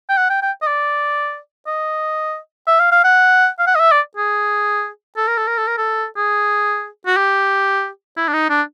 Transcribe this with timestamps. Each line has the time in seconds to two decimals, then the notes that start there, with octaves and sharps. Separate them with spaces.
0.09 G5
0.17 F#5
0.30 G5
0.42 G5
0.62 D#5
0.67 D5
1.67 D#5
2.67 E5
2.80 F5
2.92 F5
3.04 F#5
3.59 F5
3.67 F#5
3.75 D#5
3.80 E5
3.92 D5
4.17 G#4
5.17 A4
5.27 A#4
5.38 A4
5.48 A#4
5.58 A4
5.68 A#4
5.78 A4
6.17 G#4
7.06 F#4
7.17 G4
8.17 E4
8.28 D4
8.33 D#4
8.50 D4